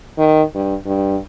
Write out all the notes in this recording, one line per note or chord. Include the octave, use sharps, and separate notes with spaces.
D#3
G2
G2